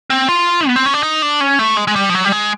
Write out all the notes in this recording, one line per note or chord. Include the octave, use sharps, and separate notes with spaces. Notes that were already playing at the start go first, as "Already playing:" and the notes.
C4
F4
B3
C4
C#4
D4
D#4
D4
C#4
A3
G#3
G#3
G3
F3
F#3
G3
G#3